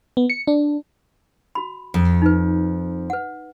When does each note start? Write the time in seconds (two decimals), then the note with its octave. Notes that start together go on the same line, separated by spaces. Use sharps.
0.17 B3
0.30 C#7
0.47 D4
1.55 F#4 B5
1.94 F2
2.22 D#4 B4
3.10 B4 F#5